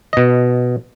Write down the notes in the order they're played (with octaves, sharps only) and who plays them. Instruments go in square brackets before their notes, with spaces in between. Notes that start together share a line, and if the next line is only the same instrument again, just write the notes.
[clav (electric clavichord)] B2 D#5